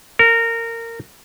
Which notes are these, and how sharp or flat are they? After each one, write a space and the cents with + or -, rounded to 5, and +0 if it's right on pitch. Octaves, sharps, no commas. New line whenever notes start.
A#4 -20